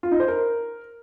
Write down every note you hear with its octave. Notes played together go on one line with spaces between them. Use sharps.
F4
D#4
C5
A#4